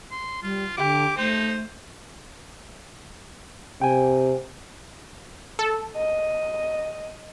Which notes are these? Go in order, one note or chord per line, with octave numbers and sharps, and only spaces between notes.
C6
G3 F4
D3 G4 D6
A3 D#4 C5
C3 G5 G#5
A4
D#5